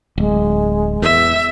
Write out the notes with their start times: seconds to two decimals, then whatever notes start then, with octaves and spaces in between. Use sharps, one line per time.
0.18 D1 G#3
1.02 E2 E5